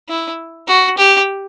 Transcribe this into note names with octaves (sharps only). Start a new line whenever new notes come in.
E4
F#4
G4